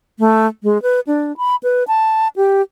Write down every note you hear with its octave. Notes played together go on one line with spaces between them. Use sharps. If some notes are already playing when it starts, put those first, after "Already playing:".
A3
G#3
B4
D4
B5
B4
A5
G4